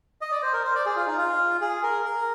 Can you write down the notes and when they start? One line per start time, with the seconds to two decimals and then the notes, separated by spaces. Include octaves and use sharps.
0.21 D#5
0.32 D5
0.42 C5
0.53 A#4
0.64 C5
0.75 D5
0.86 G#4
0.96 F4
1.07 D#4
1.18 F4
1.61 G#4
1.83 A#4
2.05 A#4